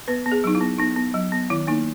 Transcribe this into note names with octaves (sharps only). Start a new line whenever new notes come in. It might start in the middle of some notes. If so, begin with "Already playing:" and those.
B3 B4
B3
G#4
F#3 D#4
E4
B3
B3 D#4
B3
F#3
B3
D#3 E4
A#3 D#4